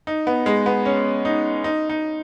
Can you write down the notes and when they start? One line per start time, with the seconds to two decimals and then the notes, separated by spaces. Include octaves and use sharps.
0.07 D#4
0.27 B3
0.46 G#3
0.66 B3
0.85 C#4
1.25 D#4
1.64 D#4
1.89 D#4